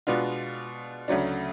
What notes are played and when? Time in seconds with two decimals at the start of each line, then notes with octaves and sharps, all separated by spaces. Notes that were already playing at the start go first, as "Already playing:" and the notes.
0.07 B2 G#3 B3 D4 F4
1.08 D2 C#3 F#3 A3 D4